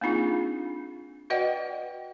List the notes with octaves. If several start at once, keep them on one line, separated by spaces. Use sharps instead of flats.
A#3 C4 D4 D#4 F4 G#4
F#4 B4 D5 D#5 F#5 G5